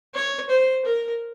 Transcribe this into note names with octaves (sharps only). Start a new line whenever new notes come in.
C#5
C5
A#4